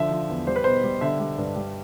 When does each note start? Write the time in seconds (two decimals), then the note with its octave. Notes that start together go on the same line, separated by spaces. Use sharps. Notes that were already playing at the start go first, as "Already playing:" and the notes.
Already playing: D3 F3 E5
0.11 F3
0.29 E2
0.47 G3 C5
0.56 B4
0.64 B2 C5
0.84 G3
1.01 D3 E5
1.20 G3
1.38 G2
1.56 G3